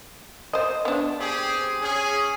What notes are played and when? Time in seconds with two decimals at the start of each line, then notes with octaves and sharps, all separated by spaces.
0.53 C5 D#5
0.85 B3 D4
1.20 C4 G4 G#4
1.82 C#4 G#4